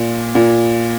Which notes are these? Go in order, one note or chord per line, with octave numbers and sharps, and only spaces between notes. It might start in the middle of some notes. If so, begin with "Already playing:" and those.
Already playing: A#2
A#2